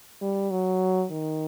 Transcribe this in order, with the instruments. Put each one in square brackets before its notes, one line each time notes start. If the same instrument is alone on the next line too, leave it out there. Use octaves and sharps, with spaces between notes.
[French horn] G3
F#3
D#3